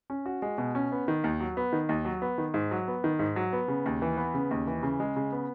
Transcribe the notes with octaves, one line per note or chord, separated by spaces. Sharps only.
C#4
F#4
G#3
B2
C#4
B3
D#3
D#2
F#3
B3
D#3
D#2
F#3
B3
D#3
G#2
F#3
B3
D#3
G#2
F#3
B3
C#3
D#2
E3
B3
C#3
D#2
E3
C#3
G#3
C#3
B3